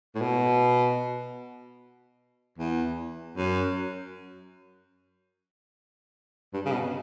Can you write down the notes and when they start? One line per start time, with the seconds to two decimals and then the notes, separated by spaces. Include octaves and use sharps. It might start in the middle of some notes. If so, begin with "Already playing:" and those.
0.15 A2
0.21 B2
2.58 E2
3.37 F#2
6.53 G2
6.65 C#3
6.72 B2